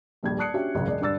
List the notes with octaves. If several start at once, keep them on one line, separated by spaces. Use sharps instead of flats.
D#1 A#1 G3 G#6
D5 A5 D#6 F#6 C7 C#7
C#4 D4 F#4 G4 E5
G#1 C#2 F#2 C#3
E1 D5 D#5
G2 D3 D5 E6 A6